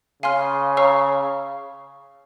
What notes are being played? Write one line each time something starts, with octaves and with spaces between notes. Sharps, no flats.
C#3 F5 G#5 C6 F6
C#5 F5 A#5 C#6 E6